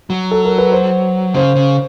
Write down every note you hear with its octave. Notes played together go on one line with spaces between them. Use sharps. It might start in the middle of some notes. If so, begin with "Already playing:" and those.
F#3
A4
A#4
B4
C5
C#3 C5
C#3